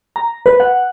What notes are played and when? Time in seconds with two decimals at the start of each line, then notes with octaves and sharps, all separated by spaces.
0.16 A#5
0.46 B4
0.60 F#5